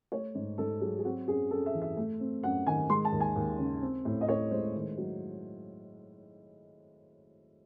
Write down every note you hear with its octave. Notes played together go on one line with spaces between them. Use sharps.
A3 C#5
G#2
G#2 A4
F#3 G#4
G#4
C4 F#4
F#2 G#4
F#2 A4
E5
E3
E5
A3
C4
F#2 F#5
D#3 G#5
G#3 C6
A5
D#2
G#5
D#2
C#3
C4
A2
D#5
A2 C#5
G#3 C5
D#3
F#3